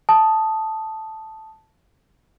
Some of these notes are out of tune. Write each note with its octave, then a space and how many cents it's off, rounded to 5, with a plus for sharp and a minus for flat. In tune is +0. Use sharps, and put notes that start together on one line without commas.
A5 +0 D#6 +0